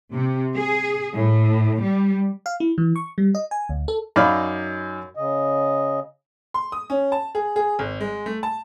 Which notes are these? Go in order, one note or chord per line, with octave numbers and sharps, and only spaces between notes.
C3
G#4
A2
G3
F5
E4
E3
C#6
G3
D#5
G#5
D2
A4
F#2 D#4 D5 F5 B5
C#3 D#5
C6
D#6
C#4
A5
G#4
G#4
G#1
G#3
A3
A5